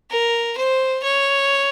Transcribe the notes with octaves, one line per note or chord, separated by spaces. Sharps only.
A#4
C5
C#5